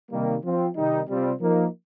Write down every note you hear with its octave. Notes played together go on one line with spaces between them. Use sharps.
C3 D#3 G3 A#3
F3 C4 F4
C3 D#3 G3 D#4
C3 G3 C4 F4
F3 A#3 D#4